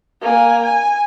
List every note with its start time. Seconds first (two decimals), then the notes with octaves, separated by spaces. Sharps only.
0.22 A#3 G#5
0.63 G#5